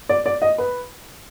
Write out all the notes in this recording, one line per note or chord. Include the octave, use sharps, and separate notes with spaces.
D5
D5
D#5
B4